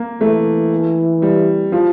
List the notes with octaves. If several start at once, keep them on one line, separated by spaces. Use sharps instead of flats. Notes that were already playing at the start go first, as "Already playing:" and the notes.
Already playing: A#3
E3 A3
G3
F3